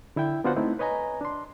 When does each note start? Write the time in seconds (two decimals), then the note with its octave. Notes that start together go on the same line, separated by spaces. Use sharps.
0.16 D3 E4 E5 G5
0.44 B3 D4 F4 F#4 C5 F#5
0.56 A3 C4 D#4 E4
0.79 B4 C#5 D#5 G#5 A#5
1.21 D4 C6